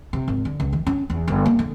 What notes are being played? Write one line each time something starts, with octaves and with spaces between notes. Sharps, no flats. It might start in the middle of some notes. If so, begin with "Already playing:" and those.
C3
G#1
D3
C#2
D#3
C#4
E2
G1
A#3
D3